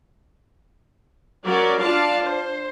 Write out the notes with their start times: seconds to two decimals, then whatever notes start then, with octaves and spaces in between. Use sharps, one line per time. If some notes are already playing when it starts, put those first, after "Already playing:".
1.44 F#3 C#4 F#4 A#4 D5
1.79 D4 F4 D5 F5 A5
2.21 C5